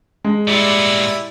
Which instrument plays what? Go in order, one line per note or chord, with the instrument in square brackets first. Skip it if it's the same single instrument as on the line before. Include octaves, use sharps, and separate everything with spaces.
[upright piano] G#3
[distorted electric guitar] A#2 B3 [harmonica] G3 E4 D5